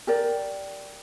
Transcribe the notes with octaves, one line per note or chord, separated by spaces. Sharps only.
G4 A#4 D5